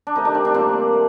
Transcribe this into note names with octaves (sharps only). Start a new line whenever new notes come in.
D4
C3 D#3 A3 D#4
D4
C4
D4
A#2 G3 A#3 C4
A3